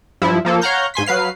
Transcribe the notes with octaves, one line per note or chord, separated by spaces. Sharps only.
G2 F3 E4
F3 A#3 A4
C#5 F5 F#5 A#5 F6 G6
G#2 G#5 C6 B6
F#3 B4 F5 C7